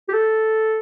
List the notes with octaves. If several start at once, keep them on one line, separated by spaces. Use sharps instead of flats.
G4
A4